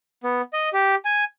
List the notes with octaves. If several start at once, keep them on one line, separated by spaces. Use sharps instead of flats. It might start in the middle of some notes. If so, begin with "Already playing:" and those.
B3
D#5
G4
G#5